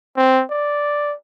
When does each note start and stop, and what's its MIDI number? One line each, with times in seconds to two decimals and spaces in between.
0.17 0.44 60
0.51 1.14 74